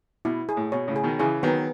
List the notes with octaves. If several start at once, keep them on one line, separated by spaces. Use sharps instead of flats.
B2 E4
G#4
A2
B2 C#5
A2 C#3
G#4
B2 D#3
C#3 E3 G#4
D#3 F#3 B3